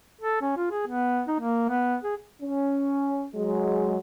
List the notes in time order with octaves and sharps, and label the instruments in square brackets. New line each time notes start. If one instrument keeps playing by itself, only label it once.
[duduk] A4
C#4
F4
G#4
B3
D#4
A#3
B3
G#4
[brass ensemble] C#4
F#3 G#3